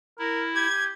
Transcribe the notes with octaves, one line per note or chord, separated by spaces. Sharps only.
E4 A#4
G4 G#6